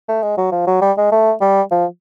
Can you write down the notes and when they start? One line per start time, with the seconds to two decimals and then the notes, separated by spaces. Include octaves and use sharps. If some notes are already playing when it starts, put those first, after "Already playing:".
0.09 A3
0.22 G#3
0.38 F#3
0.52 F3
0.67 F#3
0.82 G3
0.98 G#3
1.12 A3
1.41 G3
1.72 F3